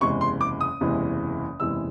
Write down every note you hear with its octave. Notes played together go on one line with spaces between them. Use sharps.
F#1 E2 C3 E3 G#3 C#6
C6
D6
D#6
F#1 E2 C3 E3 G#3
F#1 E2 C3 E3 G#3 E6